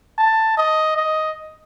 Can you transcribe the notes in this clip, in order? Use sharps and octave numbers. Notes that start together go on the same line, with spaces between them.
A5
D#5
D#5